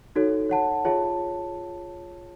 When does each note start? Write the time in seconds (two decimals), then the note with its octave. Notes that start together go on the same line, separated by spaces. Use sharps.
0.16 D#4 F#4 A4 C#5
0.50 C#5 F#5 A5
0.85 F4 G#4 C#5 E5 A5